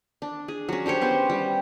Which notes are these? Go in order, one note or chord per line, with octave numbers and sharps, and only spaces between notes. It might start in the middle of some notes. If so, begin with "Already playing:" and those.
D4
G#4
F#3 C#4
D4 G4 C5 C#5
B3 C#4 C5
G3